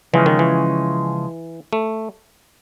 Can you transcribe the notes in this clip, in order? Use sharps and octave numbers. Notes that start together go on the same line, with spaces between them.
C#3 E3 F3 G#3 C#4
D#3
E3
A3